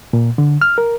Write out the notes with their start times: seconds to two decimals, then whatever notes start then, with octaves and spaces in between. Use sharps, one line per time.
0.13 A#2
0.38 D3
0.61 F6
0.78 A#4